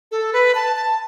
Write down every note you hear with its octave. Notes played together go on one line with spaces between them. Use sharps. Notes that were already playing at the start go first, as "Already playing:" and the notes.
A4
B4
A5
A5